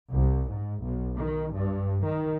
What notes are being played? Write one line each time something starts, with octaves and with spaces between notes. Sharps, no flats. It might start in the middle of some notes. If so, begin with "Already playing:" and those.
C2
G#2
B1
D#3
G2
D#3